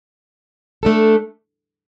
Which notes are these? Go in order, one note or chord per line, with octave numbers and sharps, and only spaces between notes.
A3 D4 A4